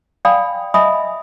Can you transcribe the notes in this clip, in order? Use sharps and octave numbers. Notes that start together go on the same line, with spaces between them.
D5 F5 G5 G#5 B5 D#6
D#5 E5 G#5 B5 D#6